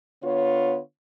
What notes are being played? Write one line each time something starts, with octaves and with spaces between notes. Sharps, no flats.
D3 B3 F4 C#5